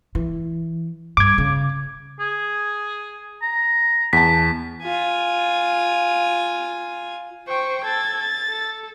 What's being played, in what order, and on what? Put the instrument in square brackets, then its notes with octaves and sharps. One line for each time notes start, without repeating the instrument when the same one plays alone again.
[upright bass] E3
[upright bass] G2 [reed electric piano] D6 G#6
[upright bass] C#3
[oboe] G#4
A#5
[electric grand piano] E2 A5 [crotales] B6
[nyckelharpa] F4 G#5
[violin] C5 [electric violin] G5 C#6
[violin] A4 A6 [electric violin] G#6
[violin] A6
[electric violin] A4